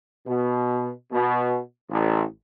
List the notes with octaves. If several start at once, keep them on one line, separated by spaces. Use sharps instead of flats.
B2
B2
A1